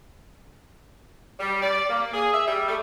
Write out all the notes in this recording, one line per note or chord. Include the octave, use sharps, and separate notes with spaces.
G3
D5
A#3
G#4
E5
G3
A3